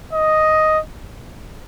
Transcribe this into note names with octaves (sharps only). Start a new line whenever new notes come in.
D#5